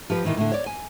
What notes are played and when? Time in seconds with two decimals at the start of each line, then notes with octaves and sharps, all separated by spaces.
0.10 F3 G4 B4
0.25 A#2 D#3 E3
0.37 A2 D3
0.52 C#5 D5
0.66 G#5